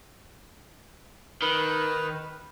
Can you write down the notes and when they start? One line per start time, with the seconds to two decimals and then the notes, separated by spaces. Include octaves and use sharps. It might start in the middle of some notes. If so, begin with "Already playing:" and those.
1.42 D#3 B4